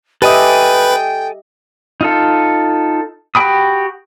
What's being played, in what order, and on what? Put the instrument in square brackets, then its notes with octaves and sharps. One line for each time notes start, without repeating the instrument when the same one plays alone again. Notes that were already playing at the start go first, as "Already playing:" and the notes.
[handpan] G4 D#5 E5 [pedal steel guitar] A4 G#5 D#6 [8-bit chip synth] B4 [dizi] G5
[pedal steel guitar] D#4 F4 A4
F#4 G4 G5 B5 D#6